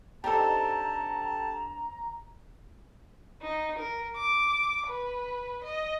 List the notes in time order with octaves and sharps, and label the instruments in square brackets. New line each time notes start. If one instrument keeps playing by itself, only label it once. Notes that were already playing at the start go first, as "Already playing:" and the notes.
[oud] C4 D4 D#4 [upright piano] G4 A4 [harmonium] A5 [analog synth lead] A#5
[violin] D#4
A#4
D6
B4
D#5